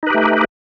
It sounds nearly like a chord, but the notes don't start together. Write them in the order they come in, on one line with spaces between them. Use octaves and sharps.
D#4 B4 G4 A3